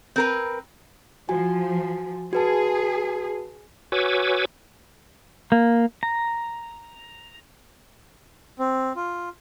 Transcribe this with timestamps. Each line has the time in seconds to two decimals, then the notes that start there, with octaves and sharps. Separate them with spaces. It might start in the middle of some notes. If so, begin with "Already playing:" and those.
0.16 C4 A#4 B4
1.29 F3 F#4 G#5
2.33 F#4 G#4 B4 A5
3.92 F#4 B4 C#5 G#5 D6 E6
5.52 A#3
6.03 A#5
8.59 C4
8.96 F4